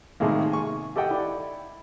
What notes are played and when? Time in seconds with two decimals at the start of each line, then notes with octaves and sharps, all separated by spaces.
0.20 A2 C3 D#3 G#3 A#3
0.52 G#5 C#6
0.96 G4 A4 D#5 F#5 G5
1.11 E4 D5